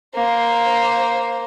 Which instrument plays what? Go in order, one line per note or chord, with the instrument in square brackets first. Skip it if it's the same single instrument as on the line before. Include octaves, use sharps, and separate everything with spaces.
[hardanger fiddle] A#3 C5